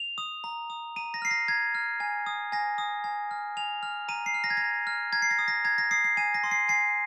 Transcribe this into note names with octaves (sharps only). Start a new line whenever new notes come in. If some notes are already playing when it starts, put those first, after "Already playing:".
Already playing: F7
D#6
A#5
D#6
A#5 D#7
A#6
F6 C7
A#6
A#5 G#6
F6
G#5
D#6
G#5 A#6
D#6
G#5
F6
G#5 F7
F6
A#5 D#7
C7
F6
A#6
G#6
A#5 A#6
F6
A#5 G#6
C7
A#6
D#6
A#6
A#5 G#6
A#6
D#6 C7
C7
G#5 D#7
A#6
C6 D#6
C7
G#5 C7